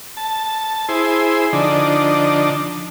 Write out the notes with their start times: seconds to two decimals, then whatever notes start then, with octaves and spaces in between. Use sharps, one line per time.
0.17 A5
0.89 E4 G#4 C5
1.53 D3 F3 D4 D#4